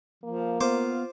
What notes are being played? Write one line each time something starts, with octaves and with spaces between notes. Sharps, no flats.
F3 A#3
B3 F4 C5 D6